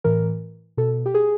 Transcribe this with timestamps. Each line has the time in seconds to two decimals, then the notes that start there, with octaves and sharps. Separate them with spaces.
0.04 A2 E3 A#4
0.77 B2 A4
1.06 G4
1.14 G#4